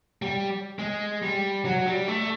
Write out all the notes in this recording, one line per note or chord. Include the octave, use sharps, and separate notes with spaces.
G3
G#3
G3
F#3
G3
A3